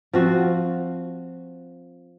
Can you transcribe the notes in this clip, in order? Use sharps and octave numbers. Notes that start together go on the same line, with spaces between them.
F3 C4 F#4